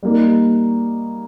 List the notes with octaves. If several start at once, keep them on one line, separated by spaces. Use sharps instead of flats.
G3 A#3 D#4